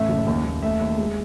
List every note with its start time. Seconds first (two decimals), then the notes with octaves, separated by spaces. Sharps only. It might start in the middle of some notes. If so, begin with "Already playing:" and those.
Already playing: A1 A3 E5
0.09 F#1
0.26 D#2
0.45 D#2
0.62 A3 E5
0.81 D#2
0.98 G#3